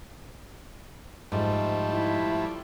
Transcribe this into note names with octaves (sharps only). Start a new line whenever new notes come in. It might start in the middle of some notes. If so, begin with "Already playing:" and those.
G#2 F3 G3 A3
E4